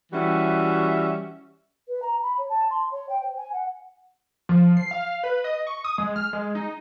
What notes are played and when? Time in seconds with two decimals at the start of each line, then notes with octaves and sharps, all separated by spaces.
0.12 E3 G3 C#4 F#4 E5
1.88 B4
2.02 A#5
2.22 B5
2.38 C#5
2.50 A5
2.70 C6
2.91 C#5
3.09 G5
3.22 C5
3.37 G#5
3.53 F#5
4.49 F3
4.77 C7
4.91 F5
5.23 B4
5.44 D#5
5.67 C#6
5.84 D#6
5.98 G#3
6.16 F6
6.33 G#3
6.55 D#4